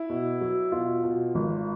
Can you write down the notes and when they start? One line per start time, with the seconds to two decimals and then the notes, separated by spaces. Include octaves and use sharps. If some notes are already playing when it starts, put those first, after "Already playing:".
Already playing: E4
0.10 B2
0.41 F#3
0.72 B2 F4
1.03 B2
1.35 G#1